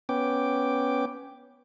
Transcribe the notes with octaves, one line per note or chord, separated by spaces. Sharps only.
B3 C#4 G5 D6